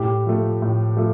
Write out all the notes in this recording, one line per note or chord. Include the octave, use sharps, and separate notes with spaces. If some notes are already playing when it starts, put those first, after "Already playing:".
Already playing: A2 G4
F3 A3
A2
F3 A3